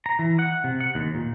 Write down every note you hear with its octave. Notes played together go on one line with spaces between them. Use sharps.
A#5
E3
F#5
C3
F#5
D#2
A#2